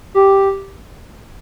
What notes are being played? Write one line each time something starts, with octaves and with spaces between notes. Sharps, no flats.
G4